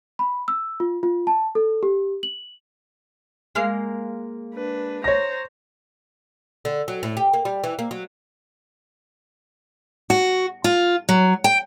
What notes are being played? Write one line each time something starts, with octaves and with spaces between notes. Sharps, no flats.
B5
E6
F4
F4
A5
A4
G4
F#7
G#3 A#3 F5
D4 B4
C5 C#5 A#5 A#6
D3
F#3
A2
G4
A#3
G3
E3
A#3
F#3
F#4
F4
F#3
G5